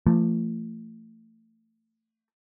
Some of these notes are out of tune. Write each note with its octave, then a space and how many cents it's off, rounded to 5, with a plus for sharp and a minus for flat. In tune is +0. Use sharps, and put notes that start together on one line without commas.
F3 -35 A3 +25